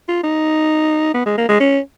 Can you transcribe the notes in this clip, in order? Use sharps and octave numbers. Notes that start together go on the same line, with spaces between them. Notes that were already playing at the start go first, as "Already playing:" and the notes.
F4
D#4
B3
G#3
A#3
G#3
C#4